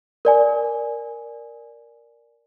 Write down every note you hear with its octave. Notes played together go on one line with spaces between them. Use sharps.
A#4 D5 G#5